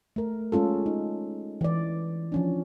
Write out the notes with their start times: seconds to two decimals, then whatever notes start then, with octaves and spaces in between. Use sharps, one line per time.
0.16 A3 A#4
0.52 G#3 C#4 F4 A4
0.86 D#4
1.61 E3 D5
2.32 F3 C#4 D4